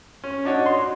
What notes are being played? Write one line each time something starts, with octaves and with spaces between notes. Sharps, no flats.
C#4
D4 D#4 F#4 C#5
C6